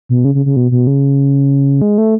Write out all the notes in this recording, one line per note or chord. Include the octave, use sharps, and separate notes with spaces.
B2
C#3
C#3
C#3
B2
B2
C#3
G#3
A3